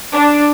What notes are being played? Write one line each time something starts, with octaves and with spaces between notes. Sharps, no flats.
D4